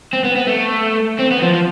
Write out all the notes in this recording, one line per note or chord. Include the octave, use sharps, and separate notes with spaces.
C4
B3
B3
A3
C4
B3
F3
F3